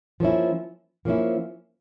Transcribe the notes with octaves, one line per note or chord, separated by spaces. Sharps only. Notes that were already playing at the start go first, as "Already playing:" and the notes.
F3 A#3 C#4 E4
F3 A#3 C#4 E4